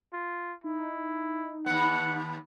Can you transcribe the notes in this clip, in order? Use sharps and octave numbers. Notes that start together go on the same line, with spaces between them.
F4
D#4 E4
D#2 B3 F#5